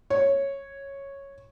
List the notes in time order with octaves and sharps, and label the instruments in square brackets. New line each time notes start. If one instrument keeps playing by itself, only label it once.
[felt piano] C#5